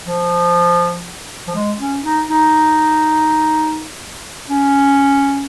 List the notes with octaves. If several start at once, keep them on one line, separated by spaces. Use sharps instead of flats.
F3
F3
G#3
C#4
D#4
D#4
C#4